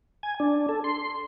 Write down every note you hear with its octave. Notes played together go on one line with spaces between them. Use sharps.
G#5
D4
A4
C6